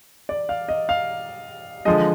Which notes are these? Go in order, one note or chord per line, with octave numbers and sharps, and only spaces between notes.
D5
F5
D#5
F5
D3 F3 G#3 D#5